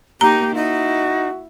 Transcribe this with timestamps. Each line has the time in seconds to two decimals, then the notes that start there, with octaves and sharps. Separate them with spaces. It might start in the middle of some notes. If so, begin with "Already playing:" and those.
0.21 A#3 D#4 G4 A#5
0.55 D#4 E4 F#4